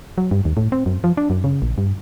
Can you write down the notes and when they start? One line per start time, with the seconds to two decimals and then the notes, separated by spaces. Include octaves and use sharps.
0.18 F#3
0.31 G2
0.45 D#2
0.57 A2
0.72 C4
0.86 F#2
1.04 F3
1.17 D4
1.30 F#2
1.44 C#3
1.62 A#1
1.78 G2